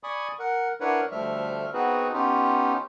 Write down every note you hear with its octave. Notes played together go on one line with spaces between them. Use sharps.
D5 G#5 B5 C#6 D#6
A#4 F#5
D4 E4 A#4 B4 C#5 F#5
D2 F3 G3 A3 E5 F6
B3 C4 D#4 F#4 G#4 B4
B3 C#4 D#4 F4 G4